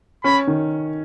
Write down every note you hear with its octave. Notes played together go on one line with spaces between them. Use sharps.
C#4 B5
D#3